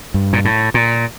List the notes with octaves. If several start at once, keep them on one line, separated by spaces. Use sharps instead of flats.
G2
A#2
A2
A#2